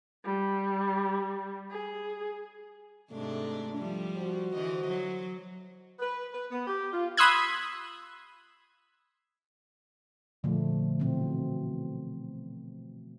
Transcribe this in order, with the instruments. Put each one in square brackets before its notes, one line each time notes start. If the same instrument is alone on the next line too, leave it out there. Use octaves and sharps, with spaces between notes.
[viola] G3
G#4
[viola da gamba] G#2 C3 D4 [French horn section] A3
[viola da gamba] F3 G3
[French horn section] F#4 C5
[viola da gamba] D3 E3 D#5
F#3
[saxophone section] B4
B4
B3
G4
F4
[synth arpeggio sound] B5 C6 D#6 E6 F#6 G#6
[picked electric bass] A#2 D3 [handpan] F3 A3
[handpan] B2 E3 C4